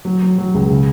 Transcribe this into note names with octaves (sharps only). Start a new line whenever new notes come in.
F#3
F#3
F#3
C#2
C#3